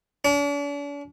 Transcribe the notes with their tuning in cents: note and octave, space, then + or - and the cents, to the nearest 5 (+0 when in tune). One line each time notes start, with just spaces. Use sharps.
D4 -45